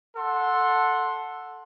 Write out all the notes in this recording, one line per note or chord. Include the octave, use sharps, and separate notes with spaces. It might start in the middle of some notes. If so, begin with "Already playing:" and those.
A4 F#5 C6